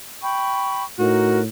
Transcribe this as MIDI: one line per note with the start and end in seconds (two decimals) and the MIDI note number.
0.22 0.83 79
0.22 0.83 83
0.22 0.83 85
0.99 1.46 45
0.99 1.40 63
0.99 1.40 66
0.99 1.40 70